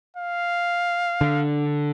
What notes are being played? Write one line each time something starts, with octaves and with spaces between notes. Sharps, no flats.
F5
D3